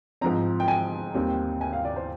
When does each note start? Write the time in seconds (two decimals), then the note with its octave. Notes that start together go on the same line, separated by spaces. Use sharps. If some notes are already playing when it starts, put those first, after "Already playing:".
0.21 G#2 F3 C4 A#5
0.60 G5
0.68 G#5
1.15 D#2 D#3 G3 C4
1.61 G#5
1.73 F5
1.85 D5
1.96 C5